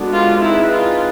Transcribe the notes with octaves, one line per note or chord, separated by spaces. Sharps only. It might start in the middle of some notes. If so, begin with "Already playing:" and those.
Already playing: G#3 B3 D4 F#4 A4
F4
C4 D#4 E4 G#4 B4
F4